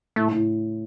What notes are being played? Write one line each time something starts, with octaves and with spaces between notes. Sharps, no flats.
A2 A3
A2